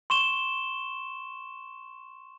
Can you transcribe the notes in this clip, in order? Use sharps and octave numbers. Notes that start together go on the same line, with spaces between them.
C6 C#6 E7 G7